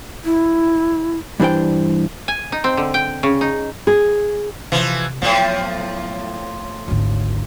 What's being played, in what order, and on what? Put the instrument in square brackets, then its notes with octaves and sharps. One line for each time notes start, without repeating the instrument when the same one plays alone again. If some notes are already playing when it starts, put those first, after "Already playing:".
[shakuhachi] E4
[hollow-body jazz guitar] G2 E3 D4 C5 G5
[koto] G#5
D#4
C4
D3
G5
C#3
D#4
[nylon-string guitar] G#4
[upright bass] C3 [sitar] E3 F3
[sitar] A2 F3 [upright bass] F#3 B3
[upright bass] G#1 D2